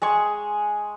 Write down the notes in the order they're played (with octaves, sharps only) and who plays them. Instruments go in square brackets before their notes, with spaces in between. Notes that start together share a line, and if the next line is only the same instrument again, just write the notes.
[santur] G#3 G#4 C#6